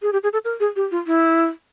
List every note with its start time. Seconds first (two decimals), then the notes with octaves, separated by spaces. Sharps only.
0.02 G#4
0.13 G4
0.23 G#4
0.33 A4
0.45 A#4
0.60 G#4
0.76 G4
0.91 F4
1.07 E4